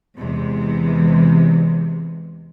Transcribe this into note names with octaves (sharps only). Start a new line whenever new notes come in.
E2 C3 E3 G#3